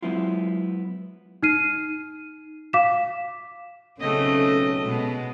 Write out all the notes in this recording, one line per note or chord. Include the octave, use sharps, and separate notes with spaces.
F#3 G#3 B3 C4 E4 F4
D#4 F6 C7 D#7
F5 D6 B6 E7
B1 C#3 A3 C4 C#4 A4 D#5
B2 G#3